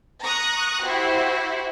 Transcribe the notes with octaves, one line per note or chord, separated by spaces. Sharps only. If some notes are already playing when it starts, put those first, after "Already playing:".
A#5 C#6 D#6 F#6
E4 F#4 G4 C5